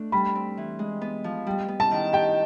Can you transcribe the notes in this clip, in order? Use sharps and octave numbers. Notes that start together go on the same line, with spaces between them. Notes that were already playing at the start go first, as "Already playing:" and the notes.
Already playing: A3 D4
G3 B5
C4
E3
G#3
B3
F3
G3
B3
A5
D#3
G4 G5